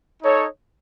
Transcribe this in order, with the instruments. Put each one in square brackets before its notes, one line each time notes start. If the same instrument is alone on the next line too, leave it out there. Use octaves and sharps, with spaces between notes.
[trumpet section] D#4 A4 C#5